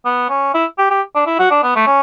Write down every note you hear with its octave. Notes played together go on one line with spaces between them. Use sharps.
B3
C#4
E4
G4
G4
D4
E4
F#4
D4
B3
A3
C#4